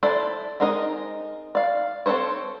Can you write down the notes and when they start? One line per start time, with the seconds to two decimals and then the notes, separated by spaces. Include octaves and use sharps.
0.03 E4 A4 C5 D5
0.60 G#3 C4 D#4 A#4 D#5
1.55 D5 F5
2.06 C4 A4 A#4 C5 C#5